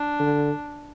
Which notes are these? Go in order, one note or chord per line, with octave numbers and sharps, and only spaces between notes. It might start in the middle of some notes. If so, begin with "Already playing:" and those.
Already playing: D4
D3